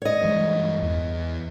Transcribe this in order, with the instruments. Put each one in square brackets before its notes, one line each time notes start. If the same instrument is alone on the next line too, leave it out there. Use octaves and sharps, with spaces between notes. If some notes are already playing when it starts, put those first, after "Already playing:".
[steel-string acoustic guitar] C#5 D#5
[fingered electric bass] G2 E3 G#3
E2